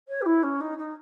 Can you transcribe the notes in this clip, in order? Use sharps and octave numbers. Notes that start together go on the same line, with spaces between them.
C#5
G4
E4
C#4
D#4
D#4